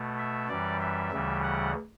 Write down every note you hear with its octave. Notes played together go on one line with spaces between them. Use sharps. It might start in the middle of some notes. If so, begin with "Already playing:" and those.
Already playing: B2 A3
E5
F#2 E3 G3 D5
E5
D2 C#3 E3 G3
F#5